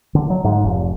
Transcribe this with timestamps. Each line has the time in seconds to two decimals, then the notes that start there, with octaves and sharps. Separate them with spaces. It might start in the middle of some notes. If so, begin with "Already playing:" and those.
0.15 D3
0.30 F#3
0.44 G#2
0.64 F1